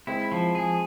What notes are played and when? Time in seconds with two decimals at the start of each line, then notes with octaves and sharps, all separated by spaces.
0.07 G#3 C4 E4
0.32 F3
0.55 G#4